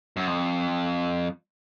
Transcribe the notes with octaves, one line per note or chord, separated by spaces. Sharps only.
F#2
F2